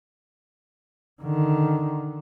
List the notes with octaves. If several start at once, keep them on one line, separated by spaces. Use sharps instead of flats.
D3 D#3